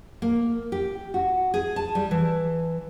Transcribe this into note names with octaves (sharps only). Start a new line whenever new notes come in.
A#3
G4
F#4
G#4
A5
G3
E3